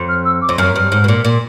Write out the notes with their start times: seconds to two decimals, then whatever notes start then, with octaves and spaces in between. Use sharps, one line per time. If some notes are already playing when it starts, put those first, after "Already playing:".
Already playing: F2
0.09 F6
0.25 E6
0.42 D6
0.49 F2
0.58 F#2 F6
0.76 G2
0.92 G#2
1.04 B2
1.08 A#2
1.25 A#2